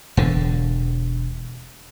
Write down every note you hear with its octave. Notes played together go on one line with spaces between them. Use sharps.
E1 D3